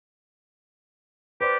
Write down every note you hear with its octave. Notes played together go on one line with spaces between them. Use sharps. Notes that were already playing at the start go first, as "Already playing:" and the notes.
G4 B4 C5 D5